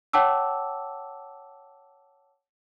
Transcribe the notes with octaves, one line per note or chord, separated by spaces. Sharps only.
C#5 F#5 G5 A5 D6 E6